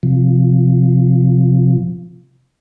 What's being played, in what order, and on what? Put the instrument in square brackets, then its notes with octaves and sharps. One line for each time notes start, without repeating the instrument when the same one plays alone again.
[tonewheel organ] C3 F3